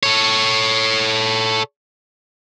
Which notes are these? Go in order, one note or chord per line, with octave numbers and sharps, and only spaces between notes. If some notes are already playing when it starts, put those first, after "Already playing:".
A4 C#5